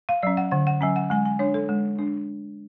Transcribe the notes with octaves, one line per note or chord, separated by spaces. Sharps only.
F5
F#3 C#4 D5
F#5
D3 F#5
F#5
F#3 C#4 G#5
F#5
G#3 G#5
G#5
D4 C#5
A4
G#3
D4